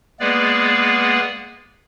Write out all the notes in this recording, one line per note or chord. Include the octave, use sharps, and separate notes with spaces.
G#3 A#3 B3 G#4 B4 D5